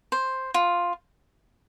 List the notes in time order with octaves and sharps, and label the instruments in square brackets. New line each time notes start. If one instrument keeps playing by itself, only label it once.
[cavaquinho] C5
F4